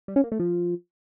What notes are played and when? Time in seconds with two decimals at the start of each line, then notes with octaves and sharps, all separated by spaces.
0.08 G3
0.16 C#4
0.24 A#3
0.32 A3
0.39 F3